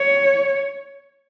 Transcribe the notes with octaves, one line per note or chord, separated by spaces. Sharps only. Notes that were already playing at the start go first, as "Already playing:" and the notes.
Already playing: C#5